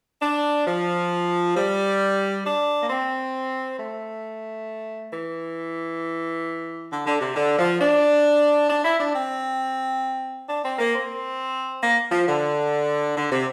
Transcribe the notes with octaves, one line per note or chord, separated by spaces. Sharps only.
D4
F3
G3
D4
A#3
C4
A3
E3
D3
D3
C3
D3
F3
D4
D4
E4
D4
C4
D4
C4
A#3
C4
A#3
F3
D3
D3
C3